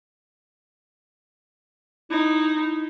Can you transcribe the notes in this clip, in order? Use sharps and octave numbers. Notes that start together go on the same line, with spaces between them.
D#4 E4